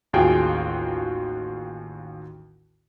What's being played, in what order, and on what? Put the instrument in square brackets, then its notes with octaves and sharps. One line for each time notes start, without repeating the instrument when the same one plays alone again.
[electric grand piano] A1 D#2 F4 F#4 G#4 G5